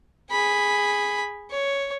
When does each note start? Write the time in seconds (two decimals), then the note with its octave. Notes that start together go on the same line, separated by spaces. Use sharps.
0.32 G#4 B5
1.51 C#5